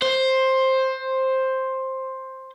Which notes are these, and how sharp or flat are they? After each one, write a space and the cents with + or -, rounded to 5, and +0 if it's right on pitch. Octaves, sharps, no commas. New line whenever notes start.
C5 +10